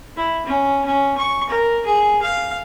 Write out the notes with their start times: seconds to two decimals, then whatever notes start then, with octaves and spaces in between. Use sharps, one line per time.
0.17 E4
0.45 C#4
0.85 C#4
1.17 C#6
1.49 A#4
1.86 G#4
2.22 F5